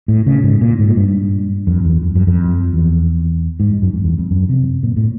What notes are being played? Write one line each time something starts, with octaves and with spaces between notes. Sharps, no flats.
A2
C#3
G#2
A#2
G#2
G2
F2
E2
F2
F#2
F2
E2
G#2
G2
F#2
F2
E2
F2
F#2
C3
A#2
A2